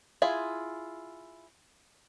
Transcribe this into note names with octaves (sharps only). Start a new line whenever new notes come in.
E4 F4 G#4